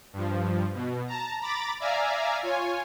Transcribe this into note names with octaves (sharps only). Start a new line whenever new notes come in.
G2 F3
B2
A5 A#5
A#5 B5 D6 A6
D5 E5 F5 G#5 A#5
F4 C#5 G#5